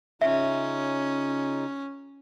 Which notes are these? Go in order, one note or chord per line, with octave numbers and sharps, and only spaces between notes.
C#3 C#4 D#4 F4 E5